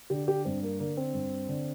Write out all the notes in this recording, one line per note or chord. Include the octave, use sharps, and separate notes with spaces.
D3 G4
G4
G2 C4
A#3
D3 A#3
C4
G2
D3